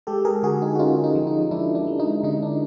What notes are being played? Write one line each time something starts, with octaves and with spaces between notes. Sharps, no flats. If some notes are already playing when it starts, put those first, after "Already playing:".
G#3 G4 A4
G#4 A#4
D3 F#4 G#4
D#4
F#4
C#4 D#4 F4
D#4
F3
D#4
F3 D4 E4
D4
G#3
D#4
D3 D#4
D4